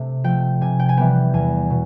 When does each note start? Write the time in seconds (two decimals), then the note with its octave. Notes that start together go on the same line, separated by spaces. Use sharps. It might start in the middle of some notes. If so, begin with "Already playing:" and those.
Already playing: C3 A3
0.24 F3 A3 G5
0.61 C3 G#5
0.79 G5
0.89 G#5
0.97 E3 G3 B3 G5
1.33 E2 G#5
1.70 B2